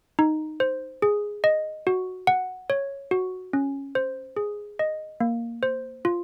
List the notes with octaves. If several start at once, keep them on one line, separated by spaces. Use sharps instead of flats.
D#4
C5
G#4
D#5
F#4
F#5
C#5
F#4
C#4
C5
G#4
D#5
A#3
C5
F4